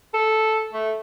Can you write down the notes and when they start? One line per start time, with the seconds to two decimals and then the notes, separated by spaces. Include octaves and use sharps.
0.14 A4
0.73 A3